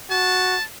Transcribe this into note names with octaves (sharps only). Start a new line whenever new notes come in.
F#4 A5